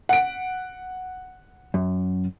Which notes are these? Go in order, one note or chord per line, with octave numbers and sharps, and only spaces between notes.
F#5 D7
F#2